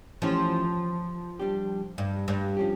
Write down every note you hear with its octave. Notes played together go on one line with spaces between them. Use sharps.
E3 F3 A3 C#4 E4 G4
G3 D4 G4
G2
G2
F3 C#4 G4